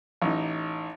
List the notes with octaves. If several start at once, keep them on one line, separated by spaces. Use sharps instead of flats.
A1 D#4